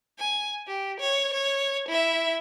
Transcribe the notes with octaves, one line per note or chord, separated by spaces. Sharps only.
G#5
G4
C#5
C#5
E4 E5